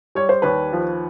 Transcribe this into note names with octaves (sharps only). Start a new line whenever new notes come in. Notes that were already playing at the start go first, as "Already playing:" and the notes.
G3 C#5
C5
D#2 B4 C#5
F3